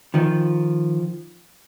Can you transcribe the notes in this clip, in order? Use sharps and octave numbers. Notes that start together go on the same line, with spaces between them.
D#3 F3